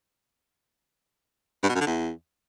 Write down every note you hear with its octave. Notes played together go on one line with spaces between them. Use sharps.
G2
B2
F#2
D3
E2